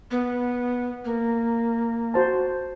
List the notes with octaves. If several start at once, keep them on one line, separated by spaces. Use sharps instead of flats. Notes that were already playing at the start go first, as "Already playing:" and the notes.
B3
A#3
F#4 C5 A5